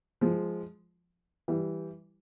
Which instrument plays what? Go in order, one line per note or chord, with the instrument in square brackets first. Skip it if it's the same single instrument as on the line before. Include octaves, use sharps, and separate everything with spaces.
[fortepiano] F3 G#3
E3 G3